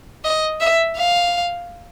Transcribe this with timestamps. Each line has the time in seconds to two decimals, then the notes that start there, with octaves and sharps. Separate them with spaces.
0.25 D#5
0.60 E5
0.97 F5